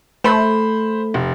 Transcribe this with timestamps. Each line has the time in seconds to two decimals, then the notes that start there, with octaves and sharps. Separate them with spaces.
0.24 A3 C5 B5
1.14 F1